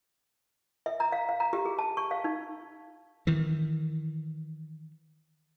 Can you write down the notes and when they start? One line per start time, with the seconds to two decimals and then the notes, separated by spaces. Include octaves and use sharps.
0.86 E5
1.00 A#5
1.12 F5
1.29 F5
1.40 A#5
1.53 G4
1.65 G#4
1.79 A5
1.97 C#6
2.11 F5
2.24 D#4
3.27 D#3 E3